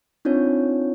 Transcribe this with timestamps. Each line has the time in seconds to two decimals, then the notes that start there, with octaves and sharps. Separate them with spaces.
0.25 C4 D4 D#4 F4 C#5